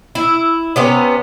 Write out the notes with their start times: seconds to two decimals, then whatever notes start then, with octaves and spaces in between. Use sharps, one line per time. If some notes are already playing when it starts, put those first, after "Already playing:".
0.15 E4
0.76 C3 B3 C#4